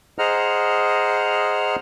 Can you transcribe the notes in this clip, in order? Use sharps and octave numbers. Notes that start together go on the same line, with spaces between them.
G#4 C5 D#5 F#5 A#5 F6